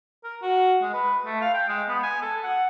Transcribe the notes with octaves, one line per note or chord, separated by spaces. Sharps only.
A#4
F#4
G#3
B4
A3
F5
G5
G#3
B3
G#5
A4
F#5